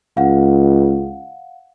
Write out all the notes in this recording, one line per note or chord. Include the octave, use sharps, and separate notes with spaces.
C#2 F5 F#5